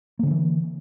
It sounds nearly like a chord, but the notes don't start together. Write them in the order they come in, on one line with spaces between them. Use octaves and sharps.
A#3 D3 F#3 E3